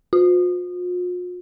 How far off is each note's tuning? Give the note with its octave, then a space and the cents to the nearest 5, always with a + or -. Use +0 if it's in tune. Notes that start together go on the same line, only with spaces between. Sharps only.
F4 +45